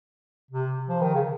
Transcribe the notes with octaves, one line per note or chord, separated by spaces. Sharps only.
C3
F3
D#3
C#3